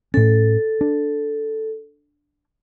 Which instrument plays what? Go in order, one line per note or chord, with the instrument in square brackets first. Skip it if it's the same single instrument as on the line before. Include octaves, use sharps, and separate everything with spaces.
[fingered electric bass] A2 C#4 [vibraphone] A4
[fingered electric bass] D4